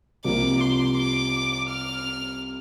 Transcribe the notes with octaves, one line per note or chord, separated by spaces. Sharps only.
C2 C3 F3 A#3 D6
C6
D6
F6